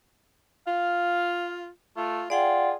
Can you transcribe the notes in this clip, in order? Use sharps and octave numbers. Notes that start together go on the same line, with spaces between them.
F4 F5
A3 F4
F4 G#4 D5 F#5 G5